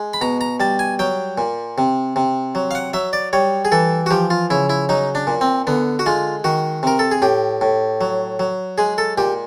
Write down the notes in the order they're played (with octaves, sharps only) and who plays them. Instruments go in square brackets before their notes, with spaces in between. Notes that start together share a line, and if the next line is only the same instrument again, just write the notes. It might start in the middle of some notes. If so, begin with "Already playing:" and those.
Already playing: [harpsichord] G#3
B5
B2 A#5
A#5
G3 A5
G#5
F#3 G5
A#2
C3
C3
F#3
F5
F#5
F#3 E5
D5
G3 C#5
G#4
E3 A4
F#4
F3 G4
F4
C#3 E4
E4
F#3 D#4
D4
A#2
C4
D3 B3
F#4
G#3 F4
D#3 F#4
C3 A#4
A4
G#4
A2 G4
A2
F#3
F#3
G#3 G#4
A4
A#2 G4